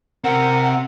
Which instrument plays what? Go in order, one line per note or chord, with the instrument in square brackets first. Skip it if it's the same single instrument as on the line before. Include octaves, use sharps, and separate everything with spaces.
[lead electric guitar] C3 C4 [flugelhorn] A#4 [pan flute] F#5